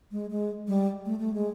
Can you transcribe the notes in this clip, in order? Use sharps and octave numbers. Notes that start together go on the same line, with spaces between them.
G#3
G#3
G3
A3
A3
G#3